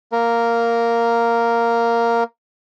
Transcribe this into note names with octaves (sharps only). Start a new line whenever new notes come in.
A#3 A#4